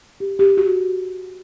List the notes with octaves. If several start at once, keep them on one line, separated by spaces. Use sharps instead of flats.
G4
G4
F#4